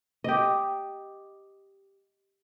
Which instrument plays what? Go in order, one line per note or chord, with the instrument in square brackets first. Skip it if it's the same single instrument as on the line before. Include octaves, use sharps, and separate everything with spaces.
[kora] G4 D#5